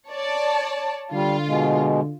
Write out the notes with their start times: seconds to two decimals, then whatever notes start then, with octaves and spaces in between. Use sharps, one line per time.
0.10 C#5 D5 A5
1.12 D3 G3 F4
1.47 B2 G#3